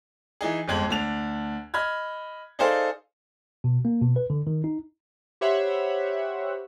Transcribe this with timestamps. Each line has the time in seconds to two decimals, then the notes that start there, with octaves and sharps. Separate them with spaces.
0.41 E3 D#4 G#4
0.68 G1 F2 G#3 G#6 F#7
0.89 D2 D4 F7
1.74 D#5 B5 F6 G#6
2.59 D#4 G#4 A4 C5 D5 F5
3.64 B2
3.85 A#3
4.01 B2
4.16 B4
4.30 D3
4.47 D#3
4.64 D#4
5.41 G4 C5 C#5 E5 F#5 B5